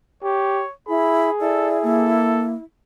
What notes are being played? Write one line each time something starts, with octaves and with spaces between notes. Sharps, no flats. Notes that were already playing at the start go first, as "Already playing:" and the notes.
G4 C#5
E4 G#4 B5
E4 A4 D5
A#3 A4